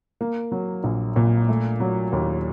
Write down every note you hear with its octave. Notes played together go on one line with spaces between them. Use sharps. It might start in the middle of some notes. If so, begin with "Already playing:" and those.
A#3
F#3
A#1
A#2
A3
F#3
D#2